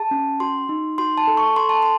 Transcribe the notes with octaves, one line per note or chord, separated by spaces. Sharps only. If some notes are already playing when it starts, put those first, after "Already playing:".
Already playing: G#4 A5
C#4
F#4 C6
D#4
F#4 C6
A5
A4
C#6
A4 C6
A5
C6